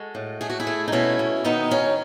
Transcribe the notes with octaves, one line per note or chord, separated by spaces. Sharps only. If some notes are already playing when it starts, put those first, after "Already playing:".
Already playing: G#3 F#4 A4
A2
A3 G#4
F#4
E4 G#4
A3
D#4
B2 C#4 E4
B2
D#3 B3 D#4
F#3 C#4